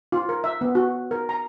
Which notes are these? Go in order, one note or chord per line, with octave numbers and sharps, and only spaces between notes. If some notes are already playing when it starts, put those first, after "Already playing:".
F4
A#4
E5
B3
F#4
A#4
A#5